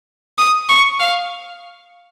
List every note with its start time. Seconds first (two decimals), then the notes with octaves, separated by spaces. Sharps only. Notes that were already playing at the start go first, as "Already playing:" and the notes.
0.38 D#6
0.69 C#6
1.00 F5